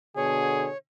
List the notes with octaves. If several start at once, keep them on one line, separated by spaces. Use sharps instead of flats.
B2 D3 G#4 C#5